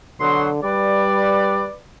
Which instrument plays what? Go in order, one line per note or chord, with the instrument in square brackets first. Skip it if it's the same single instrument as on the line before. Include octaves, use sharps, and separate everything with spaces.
[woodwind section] B2 F#3 C6 [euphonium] D3
[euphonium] G3 [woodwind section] B4 D5